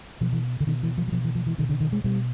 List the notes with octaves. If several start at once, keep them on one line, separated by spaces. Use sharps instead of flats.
B2 F3
E3
D3
B2 D#3
E3
F3
F#3
B2 F3
E3
F3
E3
B2 D#3
D3
D#3
G#3
B2 G3